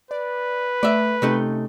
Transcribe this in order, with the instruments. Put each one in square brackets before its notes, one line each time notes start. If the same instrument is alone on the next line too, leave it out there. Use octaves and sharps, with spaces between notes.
[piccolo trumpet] B4 [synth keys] D5
[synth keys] A3 [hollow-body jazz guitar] D5 E5
[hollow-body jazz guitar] C3 A3 D#4 [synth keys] C#4